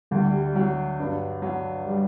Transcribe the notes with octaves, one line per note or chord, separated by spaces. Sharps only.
D2 G3
F#3
G2
F#3
G3